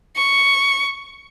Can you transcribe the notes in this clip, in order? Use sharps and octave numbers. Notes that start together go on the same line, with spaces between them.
C#6